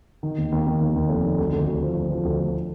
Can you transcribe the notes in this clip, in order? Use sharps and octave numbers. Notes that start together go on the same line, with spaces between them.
D#3
D#2
D#2
D#2
D#2
D#2
F1
D#3
D2
D2
D2
F3
D2
F3
D2
D2